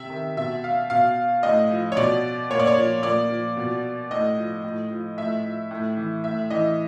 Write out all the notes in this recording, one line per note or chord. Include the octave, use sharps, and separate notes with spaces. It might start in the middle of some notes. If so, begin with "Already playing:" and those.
Already playing: C3 E5
D#3
B2 E5
F5
B2 F5
A2 D#5
F3
C#5
B2 D5
A#2 C#5
D5
C#5
F3
A#2 D5
F3
B2
A2 D#5
F3
A2
F3
A2 E5
F3
A2
E3
A2 E5
E3 D#5